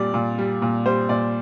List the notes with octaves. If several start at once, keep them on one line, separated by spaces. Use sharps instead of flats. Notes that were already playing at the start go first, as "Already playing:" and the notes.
Already playing: A#2 G3 D5
A#2
G3
A#2
G3 C5
A#2 D5